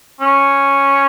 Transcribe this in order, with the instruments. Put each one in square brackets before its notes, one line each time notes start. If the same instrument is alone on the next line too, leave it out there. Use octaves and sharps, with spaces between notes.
[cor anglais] C#4